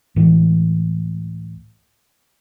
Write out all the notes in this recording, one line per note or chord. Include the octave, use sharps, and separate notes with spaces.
C#2 A2 E3